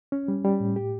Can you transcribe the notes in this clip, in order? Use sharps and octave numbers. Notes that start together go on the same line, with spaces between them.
C#4
G3
G3
A2
G4